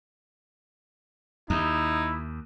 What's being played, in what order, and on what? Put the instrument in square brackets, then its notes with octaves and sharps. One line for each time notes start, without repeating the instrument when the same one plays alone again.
[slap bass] D#2 [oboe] D#4 [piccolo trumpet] E4